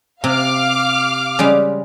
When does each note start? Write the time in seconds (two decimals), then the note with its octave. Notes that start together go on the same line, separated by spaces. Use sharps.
0.24 C3 F5 D6 F6
1.39 C#3 G3 G#3